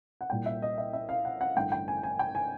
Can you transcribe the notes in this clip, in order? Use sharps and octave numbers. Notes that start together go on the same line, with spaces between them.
F#5
C2 A#2 G3 G5
E5
D#5
E5
E5
F5
F#5
F#5
A1 G2 D3 G5
G5
G#5
G#5
G5
G#5